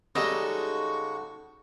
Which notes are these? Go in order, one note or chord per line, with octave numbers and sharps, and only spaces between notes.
C#3 G3 G#3 D#4 F#4 A4 D#5 C#6